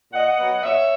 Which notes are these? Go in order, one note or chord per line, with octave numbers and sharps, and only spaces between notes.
A#2 D#5 F#5
F#3 B3
A#2 C#5 E5